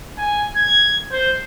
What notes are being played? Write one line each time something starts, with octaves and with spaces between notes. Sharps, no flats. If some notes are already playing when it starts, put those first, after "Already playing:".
G#5
G#6
C5